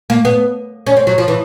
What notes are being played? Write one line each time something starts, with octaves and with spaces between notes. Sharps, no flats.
A#3
B3
C#4
C4
F#3
F3
E3